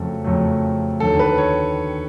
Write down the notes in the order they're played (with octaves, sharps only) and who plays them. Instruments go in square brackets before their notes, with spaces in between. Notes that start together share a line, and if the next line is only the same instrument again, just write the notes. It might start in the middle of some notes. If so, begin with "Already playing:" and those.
Already playing: [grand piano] F2 C#3 F#3 A3 A4
F2 C#3 F#3 A3
D#2 D3 F#3 A4
B4
C#5